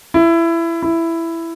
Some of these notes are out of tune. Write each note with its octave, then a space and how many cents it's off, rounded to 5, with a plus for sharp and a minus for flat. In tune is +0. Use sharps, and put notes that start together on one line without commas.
E4 +20
E4 +10